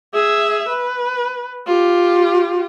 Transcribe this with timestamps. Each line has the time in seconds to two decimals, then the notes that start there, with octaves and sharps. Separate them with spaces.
0.14 G#4 E5
0.69 B4
1.67 F4 G4